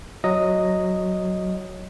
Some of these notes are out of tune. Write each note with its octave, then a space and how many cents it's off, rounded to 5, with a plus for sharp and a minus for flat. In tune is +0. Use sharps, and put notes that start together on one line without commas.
F#3 +0 D#5 +0